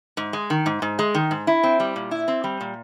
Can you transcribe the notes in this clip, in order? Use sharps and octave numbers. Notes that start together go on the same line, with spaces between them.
G#2
G#3
D#3
G#2
G#2
G#3
D#3
G#2
E4
C4
G3
A#2
E4
C4
G3
A#2